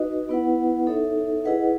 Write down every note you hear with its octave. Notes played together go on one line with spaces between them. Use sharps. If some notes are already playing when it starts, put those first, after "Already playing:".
Already playing: D#4 F#4 B4 D#5
B3 E4 B4 F#5
D#4 A4 C#5 E5
E4 G#4 B4 D#5 F#5